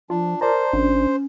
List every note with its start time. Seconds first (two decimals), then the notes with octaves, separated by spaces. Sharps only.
0.10 F3 D4 F4
0.41 A#4 C5 D5 A5 A#5
0.73 G#1 C#4 D4